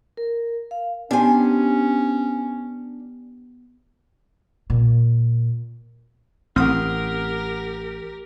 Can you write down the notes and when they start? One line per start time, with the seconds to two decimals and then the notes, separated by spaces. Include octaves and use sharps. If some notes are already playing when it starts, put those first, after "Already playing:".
0.17 A#4
0.71 F5
1.11 B3 C#4 D4 G4 C5 G#5
4.70 A#2
6.56 A1 C4 G4 A#4 F#5 D#6 F6